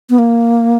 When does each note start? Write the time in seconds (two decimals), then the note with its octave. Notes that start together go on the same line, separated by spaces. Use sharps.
0.10 B3
0.19 A#3